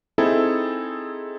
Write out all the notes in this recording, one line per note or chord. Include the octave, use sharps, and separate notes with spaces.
C4 D#4 E4 G#4 A4